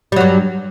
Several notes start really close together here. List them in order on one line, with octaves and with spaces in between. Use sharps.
G3 F#3 G2